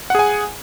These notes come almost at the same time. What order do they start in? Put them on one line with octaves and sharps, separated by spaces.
F#5 G#4 G#5